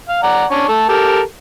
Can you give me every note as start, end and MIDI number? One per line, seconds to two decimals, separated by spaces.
0.09 0.20 77
0.23 0.45 74
0.23 0.45 78
0.23 0.45 82
0.51 0.67 61
0.51 0.67 62
0.51 0.67 85
0.68 0.88 57
0.68 0.88 69
0.89 1.20 67
0.89 1.20 69
0.89 1.20 70